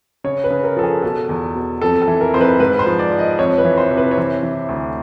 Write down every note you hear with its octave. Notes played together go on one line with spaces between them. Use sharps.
C#3 C#5
B4
C#3
A#4
F3 A4
G#4
B2 A4
E2
B2
F2 A4
A4
E3
A#4
F2 C5
B4
G#2 B4
C5
F3
D5
F3
D#5
F2 C#5
B4
E3
C5
C3
B4
C#5
E3 C5
E3
D2